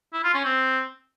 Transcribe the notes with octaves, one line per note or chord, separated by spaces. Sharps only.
E4
F4
C#4
C4